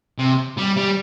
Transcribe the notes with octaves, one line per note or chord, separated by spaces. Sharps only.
C3
G3
G3